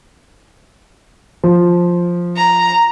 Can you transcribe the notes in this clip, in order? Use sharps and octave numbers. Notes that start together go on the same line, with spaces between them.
F3
A#5